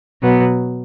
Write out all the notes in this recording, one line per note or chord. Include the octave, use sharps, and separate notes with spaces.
B2 F#3 B3